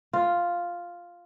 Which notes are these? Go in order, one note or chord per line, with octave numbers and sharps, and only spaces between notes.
F4